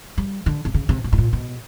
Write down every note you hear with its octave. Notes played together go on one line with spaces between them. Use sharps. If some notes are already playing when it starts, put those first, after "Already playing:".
G3
D3
C3
C#3
C3
B2
A2
A#2
B2